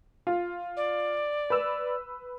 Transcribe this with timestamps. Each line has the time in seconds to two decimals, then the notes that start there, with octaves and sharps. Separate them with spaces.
0.27 F4
0.76 D5
1.50 B4 E6